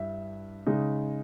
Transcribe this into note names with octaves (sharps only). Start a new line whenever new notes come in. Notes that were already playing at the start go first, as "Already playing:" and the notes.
Already playing: G2 G3 E4 E5
C#3 G#3 D#4